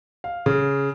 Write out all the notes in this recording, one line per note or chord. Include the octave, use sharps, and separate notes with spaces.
F5
C#3